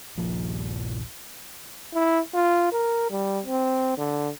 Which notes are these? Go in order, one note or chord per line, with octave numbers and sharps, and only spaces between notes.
D#1 A#1 F3
E4
F4
A#4
G3
C4
D3